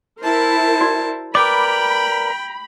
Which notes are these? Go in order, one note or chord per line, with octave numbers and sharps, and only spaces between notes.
E4 A#4 C5 A5
F#4 D5
A#4 B4 D5 G5 B5 D6